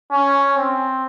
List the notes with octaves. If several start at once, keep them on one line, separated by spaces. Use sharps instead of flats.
C#4
C4